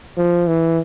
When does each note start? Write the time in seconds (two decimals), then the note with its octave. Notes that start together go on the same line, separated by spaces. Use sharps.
0.18 F3
0.48 E3